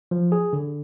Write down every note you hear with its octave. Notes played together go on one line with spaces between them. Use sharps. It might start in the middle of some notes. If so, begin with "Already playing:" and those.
F3
G#4
D3